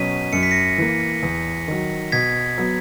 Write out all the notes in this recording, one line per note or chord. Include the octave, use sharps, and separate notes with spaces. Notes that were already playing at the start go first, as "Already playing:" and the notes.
Already playing: B2 F#3 C#4 B6 D#7
F#2 C#7
B6
A#6 C#7
E3 A#3
E2
D#3 F#3
B2 G#6 B6
F#3 B3